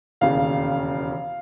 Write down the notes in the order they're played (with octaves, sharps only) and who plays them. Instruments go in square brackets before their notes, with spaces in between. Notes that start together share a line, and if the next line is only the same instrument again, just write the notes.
[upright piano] E1 D#2 C#3 E3 F5